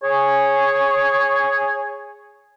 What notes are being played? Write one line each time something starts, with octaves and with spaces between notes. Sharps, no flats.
G#4 C#5